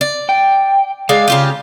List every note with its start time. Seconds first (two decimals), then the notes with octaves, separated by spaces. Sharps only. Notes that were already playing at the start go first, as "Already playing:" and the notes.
0.01 D5
0.29 G5
1.09 G#3 D5 F5
1.28 C#3 F4 G4